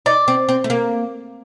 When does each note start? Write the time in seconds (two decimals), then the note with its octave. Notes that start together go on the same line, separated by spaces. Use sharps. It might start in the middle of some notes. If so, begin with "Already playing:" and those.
0.06 D#4 D5
0.28 C4
0.49 C4
0.64 A3
0.70 A#3